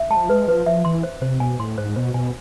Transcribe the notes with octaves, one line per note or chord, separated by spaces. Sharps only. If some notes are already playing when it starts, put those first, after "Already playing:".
Already playing: E5
G#3 A5
F3
G#3 B4
F3 B4
F3 E5
E3 C6
C5
C3 C5
B2 G#5
A2 C6
G#2 C5
B2 C5
B2 G#5